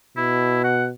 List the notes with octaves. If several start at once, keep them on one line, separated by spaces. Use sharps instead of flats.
B2 E4
F#5